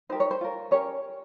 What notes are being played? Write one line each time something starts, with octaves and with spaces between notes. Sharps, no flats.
D#4 G4 A#4 C5
C#5
C5
F4 A#4
C#4 G4 A#4 C#5